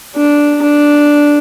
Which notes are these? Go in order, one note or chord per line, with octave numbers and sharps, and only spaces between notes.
D4
D4